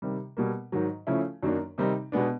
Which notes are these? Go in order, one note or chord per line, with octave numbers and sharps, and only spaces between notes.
C3 D#3 G3
B2 G3 A#3
G#2 D#3 F#3
C#3 F3 A3 C#4 E4
F#2 D#3 F#3 A#3 D4
C3 D#3 G3 C4 D#4
B2 G#3 B3 D4